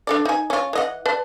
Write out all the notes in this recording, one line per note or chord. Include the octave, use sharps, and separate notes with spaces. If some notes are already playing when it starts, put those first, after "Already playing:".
D4 A4 D5
D#4 G#5
C#4 F4
E3 D#5 F#5
B4 D5 A5